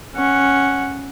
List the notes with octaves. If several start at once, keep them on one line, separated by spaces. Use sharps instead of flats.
C#4 F#5